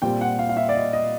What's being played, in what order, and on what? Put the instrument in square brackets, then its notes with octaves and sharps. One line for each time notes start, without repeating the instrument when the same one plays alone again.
[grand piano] A#2 G3 C4 G5
F#5
F5
F5
E5
D5
D#5
D#5